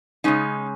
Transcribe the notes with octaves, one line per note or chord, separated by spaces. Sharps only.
C#3 G#3 C#4 D#4